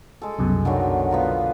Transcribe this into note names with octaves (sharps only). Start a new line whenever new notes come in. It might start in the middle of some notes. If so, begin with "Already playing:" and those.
G#3 A4
C2 F#2 B2
D3 D#3 F#3
B3 F4 A#5